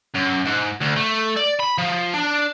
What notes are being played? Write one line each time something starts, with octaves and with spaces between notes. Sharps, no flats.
F#2
G#2
D2
A3
D5
B5
F3
D4